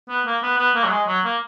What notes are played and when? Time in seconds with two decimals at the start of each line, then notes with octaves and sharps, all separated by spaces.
0.09 B3
0.26 A#3
0.43 B3
0.58 B3
0.75 A#3
0.84 F#3
0.91 G#3
1.07 F#3
1.24 A#3